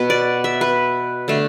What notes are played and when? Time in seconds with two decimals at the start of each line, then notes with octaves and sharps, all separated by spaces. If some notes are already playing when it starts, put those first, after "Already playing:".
Already playing: B2 B3 B4
0.10 D5
0.44 E5
0.61 B4
1.28 D3 A3